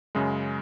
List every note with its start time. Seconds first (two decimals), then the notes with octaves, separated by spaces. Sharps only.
0.15 F#2 C#3 G#3